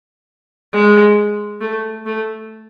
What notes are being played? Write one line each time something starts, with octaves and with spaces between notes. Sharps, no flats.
G#3
A3
A3